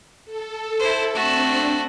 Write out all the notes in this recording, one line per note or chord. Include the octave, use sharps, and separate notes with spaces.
A4
E4 C5
A3 C4 D4 F#4